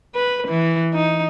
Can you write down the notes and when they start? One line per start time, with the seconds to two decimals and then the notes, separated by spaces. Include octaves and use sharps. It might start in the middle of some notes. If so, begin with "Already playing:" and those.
0.15 B4
0.48 E3
0.94 D#4